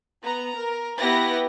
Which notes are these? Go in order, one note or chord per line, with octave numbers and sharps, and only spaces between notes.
B3 A#5
A#4
B3 E4 G4 B4 A#6